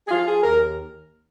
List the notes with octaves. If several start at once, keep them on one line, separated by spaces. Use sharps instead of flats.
G#4
F3 F4
G#4
D#2 A#4